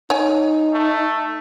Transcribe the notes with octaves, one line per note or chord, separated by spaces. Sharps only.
D#4 C#5 G#5
A3